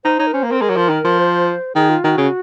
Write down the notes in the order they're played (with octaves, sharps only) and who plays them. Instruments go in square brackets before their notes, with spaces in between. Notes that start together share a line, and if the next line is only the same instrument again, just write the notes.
[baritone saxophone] D#4 [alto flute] C5
[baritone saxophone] D#4 [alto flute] C#5
[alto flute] A#4
[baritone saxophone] C#4 [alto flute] C5
[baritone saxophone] A#3
[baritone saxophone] C4 [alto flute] A#4
[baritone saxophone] G#3 [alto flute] A#4
[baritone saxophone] F#3
F3
D#3
F3
[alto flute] C5
[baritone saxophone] D#3 [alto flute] G#4
[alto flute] F4
[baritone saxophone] D#3 [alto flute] F#4
[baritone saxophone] C#3